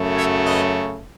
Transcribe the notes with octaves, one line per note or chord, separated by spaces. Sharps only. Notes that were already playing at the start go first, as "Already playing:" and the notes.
Already playing: F#2 C#3 F#3 A3
C#5 E5
B4 D#5